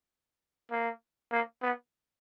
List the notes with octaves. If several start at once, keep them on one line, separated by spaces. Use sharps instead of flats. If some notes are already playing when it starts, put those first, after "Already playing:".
A#3
A#3
B3